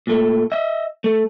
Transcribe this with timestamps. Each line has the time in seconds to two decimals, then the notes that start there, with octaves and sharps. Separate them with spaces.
0.07 A#2 A3
0.52 D#5 E5
1.04 A3